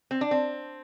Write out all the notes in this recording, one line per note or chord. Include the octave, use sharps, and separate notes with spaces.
C4
D4
C4